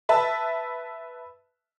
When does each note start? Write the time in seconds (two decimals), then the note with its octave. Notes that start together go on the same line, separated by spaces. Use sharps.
0.09 B4 E5 A5